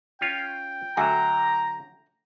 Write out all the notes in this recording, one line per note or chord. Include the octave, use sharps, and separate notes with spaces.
C#4 F4 C#5 G5
D3 F#3 A3 F#4 G#5 A#5